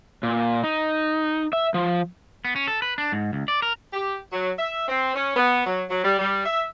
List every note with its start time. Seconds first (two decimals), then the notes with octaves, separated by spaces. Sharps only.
0.23 A#2
0.64 D#4
1.53 E5
1.74 F3
2.45 B3
2.56 C#4
2.68 A4
2.82 B4
2.98 D4
3.12 G#2
3.33 C#2
3.48 D5
3.62 A#4
3.93 G4
4.32 F#3
4.59 E5
4.87 C4
5.15 C#4
5.36 B3
5.66 F#3
5.90 F#3
6.04 G3
6.19 G3
6.45 E5